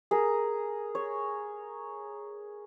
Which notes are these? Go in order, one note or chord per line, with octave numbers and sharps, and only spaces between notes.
G#4 A#4
C#5